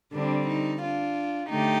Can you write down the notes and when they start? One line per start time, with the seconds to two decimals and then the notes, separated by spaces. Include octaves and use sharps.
0.14 D3 G3 C4 D4
0.48 D#4
0.82 D4 F4
1.49 D3 A3 D#4 G4